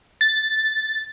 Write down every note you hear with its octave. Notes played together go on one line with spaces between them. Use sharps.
A6